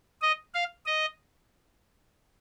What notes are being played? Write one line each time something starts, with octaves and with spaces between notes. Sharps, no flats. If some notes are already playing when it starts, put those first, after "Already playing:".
D#5
F5
D#5